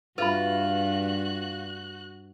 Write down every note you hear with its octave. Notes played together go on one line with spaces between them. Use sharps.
G2 F4 F#4 B4 E5 B5 F#6